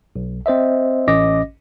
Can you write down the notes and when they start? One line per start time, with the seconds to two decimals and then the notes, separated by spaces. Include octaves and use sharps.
0.16 B1
0.46 C4 C5 D#5 E5
1.08 A1 C#4 D#5 D6 A#6